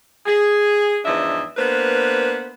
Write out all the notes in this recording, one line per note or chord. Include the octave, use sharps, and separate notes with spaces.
G#4
E2 G#2 F3 D4 D#5 E5
A#3 B3 D4 B4 C5